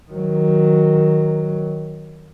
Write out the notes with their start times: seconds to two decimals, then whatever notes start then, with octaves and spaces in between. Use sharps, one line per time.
0.11 D#3 F#3